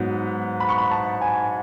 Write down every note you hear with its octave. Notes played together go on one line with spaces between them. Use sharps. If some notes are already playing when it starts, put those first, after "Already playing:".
Already playing: G#2 F#3 B3
B5
C#6
B5
A5
G#5